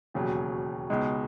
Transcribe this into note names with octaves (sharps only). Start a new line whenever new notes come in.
E1 D#2 C#3 F#3
C#2 B2 G#3 D#4